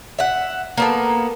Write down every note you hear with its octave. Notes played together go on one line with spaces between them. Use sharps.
E5 F#5
A#3 B3 A4